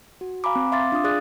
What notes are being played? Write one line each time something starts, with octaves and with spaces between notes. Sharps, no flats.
F#4
F5 G#5 A#5 B5 D6
C4
E5 F5 C6 D6 A6
D4 F4 F5 D#6
G#4 D5 D#6 F#6 A6